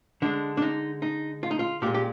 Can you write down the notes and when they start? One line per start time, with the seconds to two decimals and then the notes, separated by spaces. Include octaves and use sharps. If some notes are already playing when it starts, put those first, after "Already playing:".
0.22 D3 G#3 D4
0.57 D4
0.62 D#4
1.02 D#4
1.43 F4
1.51 D#4
1.59 F4
1.82 A#2 G4
1.86 G#3
1.94 G4